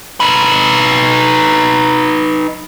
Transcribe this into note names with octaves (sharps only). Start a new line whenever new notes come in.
D#4 B4